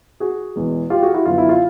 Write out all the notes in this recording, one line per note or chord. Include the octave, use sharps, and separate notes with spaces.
F#4 G#4
E2 B2 G#3 B3
F4 G4
F#4 G#4
E4 F#4
F#2 D3 F#3 B3 F4
E4
F4